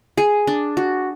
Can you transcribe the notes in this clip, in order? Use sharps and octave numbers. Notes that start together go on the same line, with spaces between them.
G#4
D4
F#4